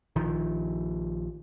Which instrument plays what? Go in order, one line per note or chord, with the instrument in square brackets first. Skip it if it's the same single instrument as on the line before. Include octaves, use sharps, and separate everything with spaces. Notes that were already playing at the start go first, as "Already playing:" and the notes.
[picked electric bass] A#1 D#3 F3